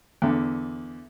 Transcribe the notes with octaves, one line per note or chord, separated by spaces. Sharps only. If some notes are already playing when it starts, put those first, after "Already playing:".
E2 D3